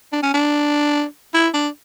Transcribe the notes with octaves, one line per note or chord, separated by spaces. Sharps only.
D4
C#4
D4
E4
D4